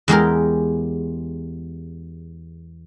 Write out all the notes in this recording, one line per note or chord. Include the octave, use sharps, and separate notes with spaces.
E2 G#3 G4 A#4